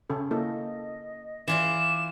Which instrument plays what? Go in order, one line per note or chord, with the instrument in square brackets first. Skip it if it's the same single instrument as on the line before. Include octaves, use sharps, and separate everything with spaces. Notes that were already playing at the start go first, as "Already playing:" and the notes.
[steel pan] C#3 C#4 A4
[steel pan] A#3 E4 A4 [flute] D#5
[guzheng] E3 F4 D5 [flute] D6 [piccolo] E7